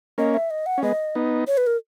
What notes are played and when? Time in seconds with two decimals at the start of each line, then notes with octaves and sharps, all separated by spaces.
0.18 A#3 C#4 D#5
0.34 E5
0.51 D#5
0.66 F#5
0.78 C#4
0.83 G#3 B3 D#5
1.15 B3 D#4
1.47 C#5
1.57 B4
1.67 A#4